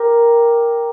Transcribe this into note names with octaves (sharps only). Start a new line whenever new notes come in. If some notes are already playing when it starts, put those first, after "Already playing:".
Already playing: G4 A#4